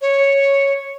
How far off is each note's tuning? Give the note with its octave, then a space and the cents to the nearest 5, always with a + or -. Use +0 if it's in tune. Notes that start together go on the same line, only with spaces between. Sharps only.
C#5 -5